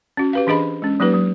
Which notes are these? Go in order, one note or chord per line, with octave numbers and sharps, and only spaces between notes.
C#4 F#4
G4 B4 F5
E3 D4 G#4 D#5 B5
G#3 C#4
F#3 A#3 D#4 G4 B4
F#3